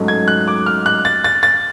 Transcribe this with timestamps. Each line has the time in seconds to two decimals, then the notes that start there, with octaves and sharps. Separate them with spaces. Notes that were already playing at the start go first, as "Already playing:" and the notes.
Already playing: G#2 F#3 A3 C#4
0.08 G#6
0.28 F#6
0.48 D6
0.66 F6
0.86 F#6
1.05 A6
1.24 A6
1.43 A6